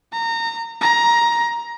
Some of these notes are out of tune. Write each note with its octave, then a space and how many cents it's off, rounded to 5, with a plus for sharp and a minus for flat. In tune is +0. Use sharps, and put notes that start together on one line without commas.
A#5 -25
A#5 +15